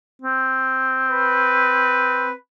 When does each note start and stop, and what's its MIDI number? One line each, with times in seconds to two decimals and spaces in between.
0.22 2.33 60
1.10 2.34 71